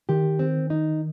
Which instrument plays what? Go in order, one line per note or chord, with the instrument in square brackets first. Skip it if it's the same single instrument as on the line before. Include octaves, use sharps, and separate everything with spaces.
[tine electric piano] D#3 [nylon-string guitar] G4
[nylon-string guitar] C4
D#4